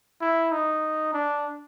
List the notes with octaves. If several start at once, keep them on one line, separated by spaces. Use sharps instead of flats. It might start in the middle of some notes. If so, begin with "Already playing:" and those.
E4
D#4
D4